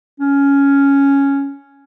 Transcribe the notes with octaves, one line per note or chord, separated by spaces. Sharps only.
C#4